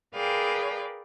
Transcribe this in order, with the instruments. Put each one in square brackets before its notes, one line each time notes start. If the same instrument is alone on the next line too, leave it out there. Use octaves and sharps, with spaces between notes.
[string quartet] G#4 A#4 B4 D5 F5 G5